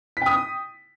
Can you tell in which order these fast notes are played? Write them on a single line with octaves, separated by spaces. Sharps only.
B6 G5 D#6